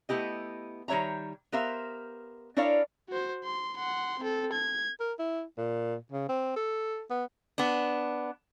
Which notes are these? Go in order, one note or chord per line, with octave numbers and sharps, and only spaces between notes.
A3 B3 E4 G4 D#5
D#3 G3 C#5 E5 A#5
B3 G4 A#4 C5 E5 F5
D4 E4 A#4 C#5 D5 F5
F#4 C5
C6
F#5 C6
C4 A4
G#6
A#4
E4
A#2
C#3
C4
A4
B3
B3 D4